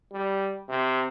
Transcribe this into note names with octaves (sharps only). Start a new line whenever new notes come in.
G3
C3